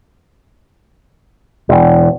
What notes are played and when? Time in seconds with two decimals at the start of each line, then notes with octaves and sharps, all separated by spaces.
1.69 E1